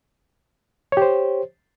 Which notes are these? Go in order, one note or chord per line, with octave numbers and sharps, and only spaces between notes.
G4 C5 C#5